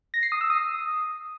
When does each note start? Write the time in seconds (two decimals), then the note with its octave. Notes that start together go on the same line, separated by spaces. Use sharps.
0.14 A#6
0.23 C7
0.32 D#6
0.41 E6
0.50 D#6